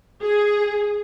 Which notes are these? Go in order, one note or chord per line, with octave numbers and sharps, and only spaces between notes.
G#4